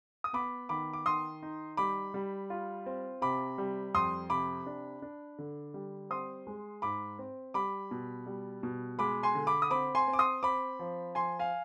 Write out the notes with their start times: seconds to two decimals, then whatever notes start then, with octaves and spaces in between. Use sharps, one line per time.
0.24 D#6
0.33 B3 B5 D6
0.69 D#3 B5 D6
0.93 D6
1.06 D#3 C6 D#6
1.42 D#4
1.77 G3 B5 D6
2.14 G3
2.50 F4
2.86 C4
3.22 C3 B5 D6
3.58 G3
3.95 F2 C6 D#6
4.30 C3 B5 D6
4.66 D4
5.02 D4
5.39 D3
5.74 G3
6.10 C4 C6 D#6
6.47 G#3
6.82 G#2 B5 D6
7.19 C4
7.54 G3 B5 D6
7.91 B2
8.26 G3
8.63 B2
8.99 G#3 B5 D6
9.23 G#5 C6
9.35 D3
9.47 B5 D6
9.62 D#6
9.71 C4 B5 D6
9.95 G#5 C6
10.08 C4
10.13 D6
10.19 C6 D#6
10.43 C4 B5 D6
10.79 F3
11.15 F3 G#5 C6
11.39 F5 G#5